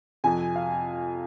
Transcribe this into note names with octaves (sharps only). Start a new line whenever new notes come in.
F2 C3 F3 G#5
F5